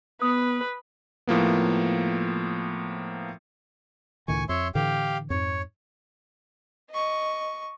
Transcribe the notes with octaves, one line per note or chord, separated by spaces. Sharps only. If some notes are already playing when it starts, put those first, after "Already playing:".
B3 B4 D#6
A2 F3 A#3 B3
C#2 A2 D#3 G#5 C#6
F2 C#5 E5 C6
A2 D3 E3 G4 F5 G5
F2 G#2 C#5
D#5 C#6